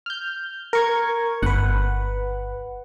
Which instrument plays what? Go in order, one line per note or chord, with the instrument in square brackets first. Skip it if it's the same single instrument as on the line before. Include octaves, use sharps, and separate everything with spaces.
[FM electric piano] F6 G6
A#4 C#6 G#6
[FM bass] G1 [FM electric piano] B4 F#5